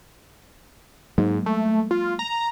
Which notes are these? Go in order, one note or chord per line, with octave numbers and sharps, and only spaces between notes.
G#2 F#3 G#3 A#3
A3
F4
A#5